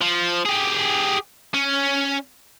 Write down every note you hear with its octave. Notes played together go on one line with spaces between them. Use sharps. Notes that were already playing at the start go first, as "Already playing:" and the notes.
F3
G4 G#4
C#4